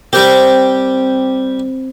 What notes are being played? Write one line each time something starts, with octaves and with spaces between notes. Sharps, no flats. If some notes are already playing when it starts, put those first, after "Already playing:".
G3 C4 G4 A#4